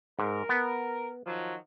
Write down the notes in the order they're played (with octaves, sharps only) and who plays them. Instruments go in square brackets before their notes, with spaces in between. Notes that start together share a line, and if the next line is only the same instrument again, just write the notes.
[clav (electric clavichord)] G#2 [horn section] A#4
[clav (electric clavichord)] B3
[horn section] D#3 F3 F#3